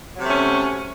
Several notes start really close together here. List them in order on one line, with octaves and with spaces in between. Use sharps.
F#3 C3 A3 C#4